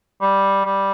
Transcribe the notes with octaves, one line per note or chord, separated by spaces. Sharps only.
G3
G3